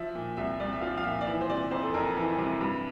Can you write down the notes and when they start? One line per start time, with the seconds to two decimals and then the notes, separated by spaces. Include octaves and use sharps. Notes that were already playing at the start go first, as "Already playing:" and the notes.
Already playing: F3 E5
0.15 A#2
0.37 C2 E5
0.60 C2 D5
0.73 E5
0.81 F3 F5
0.97 F5
1.04 A#2 E5
1.21 D5
1.26 E3 E5
1.41 C5
1.50 C3 D5
1.71 F2 C5
1.83 A4
1.94 F2 A#4
2.16 E3
2.38 C3
2.61 G2